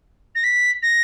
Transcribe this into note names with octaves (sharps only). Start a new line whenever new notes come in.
A#6
B6
A#6